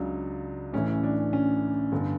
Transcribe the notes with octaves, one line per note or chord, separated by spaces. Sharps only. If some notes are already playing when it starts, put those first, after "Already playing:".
Already playing: C#2 C#3 F#3 D4
A1 A2 E3 C#4
D4
C#4
G1 D3